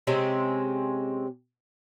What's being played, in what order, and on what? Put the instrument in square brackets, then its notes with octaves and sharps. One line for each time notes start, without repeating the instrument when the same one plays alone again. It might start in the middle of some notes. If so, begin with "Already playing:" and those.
[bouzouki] C3 G#3 C4 C#4